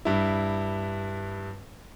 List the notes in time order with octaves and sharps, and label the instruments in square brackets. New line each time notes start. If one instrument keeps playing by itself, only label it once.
[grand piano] G2 E4